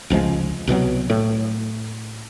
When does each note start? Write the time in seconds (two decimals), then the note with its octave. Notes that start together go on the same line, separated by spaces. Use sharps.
0.10 F1 C#2 F3 G#3
0.67 C2 B2 D#3 F#3
1.10 A2